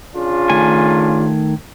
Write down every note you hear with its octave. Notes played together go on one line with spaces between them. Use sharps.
C#3 D4 F4
D#3 A3 G#5